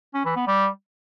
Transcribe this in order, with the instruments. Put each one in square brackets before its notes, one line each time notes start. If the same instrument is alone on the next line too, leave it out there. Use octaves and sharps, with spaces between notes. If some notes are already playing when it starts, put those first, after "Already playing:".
[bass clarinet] C#4
E3
B3
G3